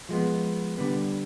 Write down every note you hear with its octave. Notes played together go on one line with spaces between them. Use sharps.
F3 G#3 B3
D3 G3 B3